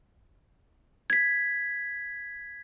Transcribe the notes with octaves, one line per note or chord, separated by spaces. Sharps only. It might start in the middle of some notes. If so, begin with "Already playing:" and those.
G#6 B6